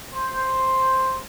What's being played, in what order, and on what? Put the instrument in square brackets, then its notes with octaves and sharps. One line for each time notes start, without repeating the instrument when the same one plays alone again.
[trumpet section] C5